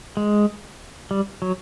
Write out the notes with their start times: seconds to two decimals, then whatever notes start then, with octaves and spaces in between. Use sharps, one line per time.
0.17 G#3
1.11 G3
1.42 F#3